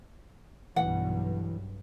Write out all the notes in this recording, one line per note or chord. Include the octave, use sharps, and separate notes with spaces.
B1 G2 E3 F#5